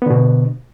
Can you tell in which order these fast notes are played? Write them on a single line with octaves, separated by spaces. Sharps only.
B3 D3 B2